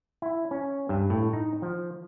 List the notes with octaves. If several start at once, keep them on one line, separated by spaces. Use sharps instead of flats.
E4
C#4
G2
A2
D#4
F3